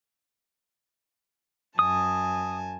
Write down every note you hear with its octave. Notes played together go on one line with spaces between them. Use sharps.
F#2 G#5 A5 D#6